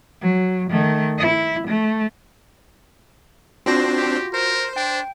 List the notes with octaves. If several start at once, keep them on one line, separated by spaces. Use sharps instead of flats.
F#3
D#3 A3
E4
A3
C4 D4 F4 F#4 C5 A#6
G4
A#4 C5
D4 G5